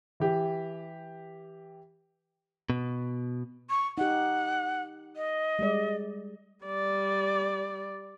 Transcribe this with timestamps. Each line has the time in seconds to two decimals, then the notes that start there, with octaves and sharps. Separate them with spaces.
0.20 E3 G4
2.70 B2
3.70 C#6
3.98 D#4 G4 F#5
5.16 D#5
5.59 G3 G#3 D5
6.65 G3 D5